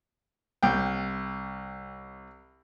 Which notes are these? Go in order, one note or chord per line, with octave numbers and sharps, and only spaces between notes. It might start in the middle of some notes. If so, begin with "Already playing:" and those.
C2 G5